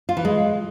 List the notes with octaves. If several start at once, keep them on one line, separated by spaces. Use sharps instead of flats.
F4
E3
G#3